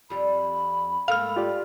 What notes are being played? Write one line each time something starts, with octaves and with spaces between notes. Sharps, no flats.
F2 G3 B5
G#2 A3 A#3 F5 F6
F4 G4 D5